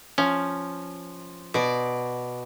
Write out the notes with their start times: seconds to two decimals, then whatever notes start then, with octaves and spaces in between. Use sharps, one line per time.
0.18 F3 C#4
1.54 B2 D5